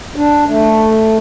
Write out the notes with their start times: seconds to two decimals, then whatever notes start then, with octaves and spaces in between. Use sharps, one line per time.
0.16 D4
0.48 A3